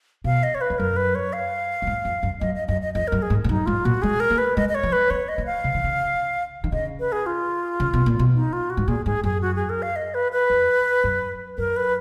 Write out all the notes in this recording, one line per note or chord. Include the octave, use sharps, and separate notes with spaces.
B2 F5
D#5
C#5
B4
F2
F#2 A#4
B4
C#5
F5
F#2
G#2
F2
F#2
F#2 D#5
D#5
F#2 D#5
D#5
F2 D#5
F#2 A#4
G#4
G#2
G#2
F#2 D#4
G#2 F4
A#2 F#4
G#3 G#4
A#4
A#3
B4
G#3 D#5
D#5
C#5
F3
B4
B3 C#5
D#5
A#3
F5
C#3
D#3
C#3
D#3
C#3 D#5
B4
G#4
F4
C#3
B2
A#2
B2
D#4
F4
F#4
G#2
A#2 G#4
G#2 G#4
F#2 G#4
F#4
G#4
A#4
F5
D#5
B4
B4
F2
F#2
F#2 A#4
B4